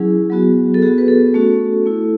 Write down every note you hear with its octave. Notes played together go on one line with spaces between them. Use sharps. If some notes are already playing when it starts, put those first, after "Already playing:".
Already playing: F#3 C#4 E4 G#4
F#3 B3 F#4
A4
B3 F#4 G#4
B4
A4
A3 C#4 F#4
A3 E4